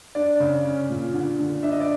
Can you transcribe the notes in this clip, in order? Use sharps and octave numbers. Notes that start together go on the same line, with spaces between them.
D4 D5
C#3
C#4
A#2
D3
D3
D4 E5
D#5
D5